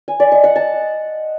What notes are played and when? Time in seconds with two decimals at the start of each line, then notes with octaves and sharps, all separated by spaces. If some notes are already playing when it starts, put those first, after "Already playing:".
0.08 G#5
0.20 D5
0.32 D#5
0.44 F#5
0.56 A5